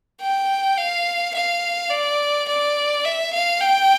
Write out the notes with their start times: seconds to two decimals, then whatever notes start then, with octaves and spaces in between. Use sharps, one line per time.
0.22 G5
0.78 F5
1.35 F5
1.91 D5
2.48 D5
3.05 E5
3.33 F5
3.61 G5